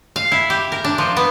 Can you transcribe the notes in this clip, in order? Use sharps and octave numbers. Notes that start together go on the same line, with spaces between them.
F5
E4
G4
A#4
D4
F3
B3